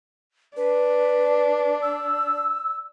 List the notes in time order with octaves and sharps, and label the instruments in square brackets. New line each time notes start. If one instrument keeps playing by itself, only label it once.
[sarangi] D4 [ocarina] B4
[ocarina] E6